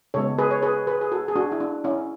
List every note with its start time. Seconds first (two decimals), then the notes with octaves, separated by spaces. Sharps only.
0.14 C#3 G#3 B3 A4 C#5
0.38 G#4 B4
0.51 C#5
0.62 G#4 B4
0.87 G#4 B4
1.01 G#4
1.12 F#4 A4
1.28 G#4
1.36 D4 F#4
1.52 E4
1.60 D4
1.84 C#4 E4